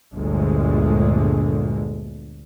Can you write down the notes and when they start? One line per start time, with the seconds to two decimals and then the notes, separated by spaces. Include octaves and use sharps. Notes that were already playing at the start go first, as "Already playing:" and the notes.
0.13 G1 D2 A#2 D3 G#3